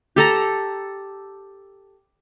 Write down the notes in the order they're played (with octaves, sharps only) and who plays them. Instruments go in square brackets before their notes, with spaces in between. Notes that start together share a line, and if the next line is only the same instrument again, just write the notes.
[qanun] G4 A4 A#5